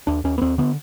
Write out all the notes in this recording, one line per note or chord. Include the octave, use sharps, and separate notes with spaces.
D#2 D4
D#2 C#4
B3
D#2 C4
D3 B3